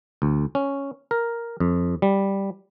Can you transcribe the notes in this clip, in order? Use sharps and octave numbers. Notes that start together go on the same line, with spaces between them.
D2
C#4
A#4
F2
G3